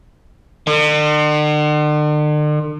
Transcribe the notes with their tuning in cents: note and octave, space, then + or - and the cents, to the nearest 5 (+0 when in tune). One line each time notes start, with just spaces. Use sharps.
D3 +45